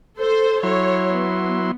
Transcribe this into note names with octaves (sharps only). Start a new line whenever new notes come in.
A4 C5
F#3 E4 C#5 C6
B3